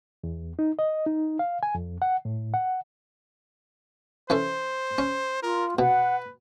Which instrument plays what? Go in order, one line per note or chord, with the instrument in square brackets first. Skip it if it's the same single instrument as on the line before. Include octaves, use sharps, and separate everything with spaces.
[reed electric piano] E2
D#4
D#5
D#4
F5
G#5
F2
F#5
A2
F#5
[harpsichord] E3 C#4 A4 [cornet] C5
[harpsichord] C#4
[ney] F4 [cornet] A#4
[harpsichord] B2 [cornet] B4 [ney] F#5